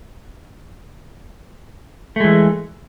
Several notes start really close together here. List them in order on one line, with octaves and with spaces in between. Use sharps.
A3 G#3 E3